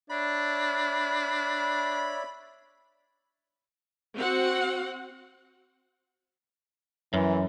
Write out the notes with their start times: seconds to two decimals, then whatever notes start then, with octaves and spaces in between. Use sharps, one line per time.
0.10 D4 C#5 D5 E5 B5
4.16 C4 F#4 F#5
7.14 F#2 E3